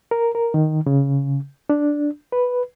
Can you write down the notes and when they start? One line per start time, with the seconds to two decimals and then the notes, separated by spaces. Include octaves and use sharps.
0.11 A#4
0.35 A#4
0.54 D#3
0.86 C#3
1.70 D4
2.32 B4